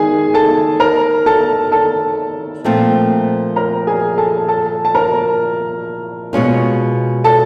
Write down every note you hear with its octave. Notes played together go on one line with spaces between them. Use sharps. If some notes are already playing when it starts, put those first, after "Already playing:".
Already playing: D#3 G#3 G#4 G#5
A4 A5
A#4 A#5
A4 A5
A4 A5
A#2 F3 A3 C4 F4
A#4 A#5
G#4 G#5
A4 A5
A4 A5
A5
A#4 A#5
B2 G#3 C#4 F4
A4 A5